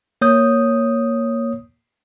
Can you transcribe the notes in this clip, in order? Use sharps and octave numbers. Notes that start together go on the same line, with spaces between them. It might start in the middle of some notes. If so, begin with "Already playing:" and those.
A#3 C#5 D#6 G6